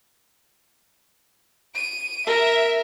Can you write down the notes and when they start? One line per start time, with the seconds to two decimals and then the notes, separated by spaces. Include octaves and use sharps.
1.74 D7 D#7
2.26 A#4 E5